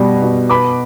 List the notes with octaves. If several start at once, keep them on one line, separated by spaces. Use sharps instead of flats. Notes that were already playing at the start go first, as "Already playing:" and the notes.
Already playing: B2 G3
B2
B3 B5 D6